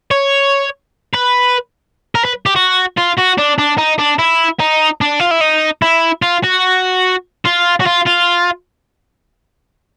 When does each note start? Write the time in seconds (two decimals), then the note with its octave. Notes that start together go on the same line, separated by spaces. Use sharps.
0.11 C#5
1.14 B4
2.15 A#4
2.25 B4
2.46 G4
2.56 F#4
2.97 F4
3.18 F#4
3.38 D4
3.58 D4
3.78 D#4
3.99 D4
4.19 E4
4.60 D#4
5.01 D4
5.20 F4
5.31 E4
5.41 D#4
5.82 E4
6.22 F4
6.44 F#4
7.46 F4
7.81 F#4
7.86 F4
8.07 F4